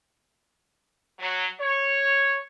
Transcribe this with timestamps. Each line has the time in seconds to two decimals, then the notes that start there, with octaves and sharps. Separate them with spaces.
1.20 F#3
1.60 C#5